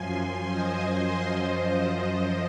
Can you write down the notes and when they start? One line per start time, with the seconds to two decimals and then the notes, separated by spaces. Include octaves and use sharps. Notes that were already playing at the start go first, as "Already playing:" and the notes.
Already playing: F#2 F3 G#5 C6
0.49 C5 D#5
1.21 F#2 F3 C5 D#5
1.92 C5 D#5